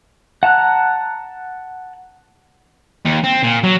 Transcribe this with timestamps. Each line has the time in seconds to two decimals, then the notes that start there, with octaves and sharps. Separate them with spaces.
0.43 F#5 A5 A#5 F#6
3.05 D#2
3.23 C4
3.43 A#2
3.63 F#3